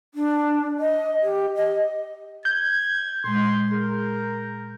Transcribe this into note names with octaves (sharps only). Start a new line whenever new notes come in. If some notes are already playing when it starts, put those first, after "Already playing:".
D4
D#5
G4
D#5
G6 G#6
A#2 G#3 C6
G#4 A#4